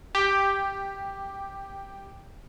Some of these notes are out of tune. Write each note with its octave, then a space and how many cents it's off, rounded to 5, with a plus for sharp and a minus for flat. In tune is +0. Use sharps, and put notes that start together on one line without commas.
G4 +5